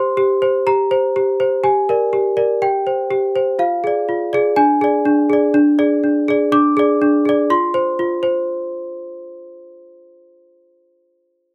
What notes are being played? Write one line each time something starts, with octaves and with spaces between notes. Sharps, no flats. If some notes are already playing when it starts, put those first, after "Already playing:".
Already playing: G4 C5 C6
G4
C5
G4 A#5
C5
G4
C5
G4 G#5
A#4 D5
G4
A#4 D5
G4 G5
C5
G4
C5
F4 F5
G#4 D5
F4
G#4 D5
D4 G#5
G#4 D5
D4
G#4 D5
D4
G#4 D5
D4
G#4 D5
D4 D6
G#4 D5
D4
G#4 D5
F4 C6
C5
F4
C5